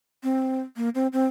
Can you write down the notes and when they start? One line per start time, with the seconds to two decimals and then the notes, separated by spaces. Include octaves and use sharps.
0.23 C4
0.77 A#3
0.95 C4
1.13 C4